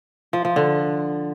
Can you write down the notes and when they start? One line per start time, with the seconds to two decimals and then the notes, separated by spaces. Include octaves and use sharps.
0.33 F3
0.45 F3
0.56 D3